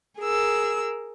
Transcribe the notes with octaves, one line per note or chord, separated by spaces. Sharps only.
G#4 A#4 E6